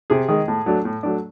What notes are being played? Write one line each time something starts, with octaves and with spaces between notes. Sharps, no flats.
C3 G#4
D#3 G#3
A2
F#3 A3 D4
A2
F#3 A3 D4